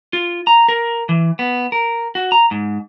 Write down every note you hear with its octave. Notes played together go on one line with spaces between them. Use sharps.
F4
A#5
A#4
E3
B3
A#4
F#4
A#5
G#2